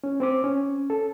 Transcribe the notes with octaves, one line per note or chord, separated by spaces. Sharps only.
C#4
C4 C5 D6
C#4
A4